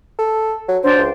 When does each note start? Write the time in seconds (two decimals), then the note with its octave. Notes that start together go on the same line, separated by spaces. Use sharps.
0.18 A4
0.68 F#3
0.83 F#3 D4 C5 C6
0.97 C#2